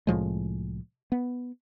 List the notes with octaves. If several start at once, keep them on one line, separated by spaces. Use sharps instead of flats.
C2 A2 F3 G#3
B3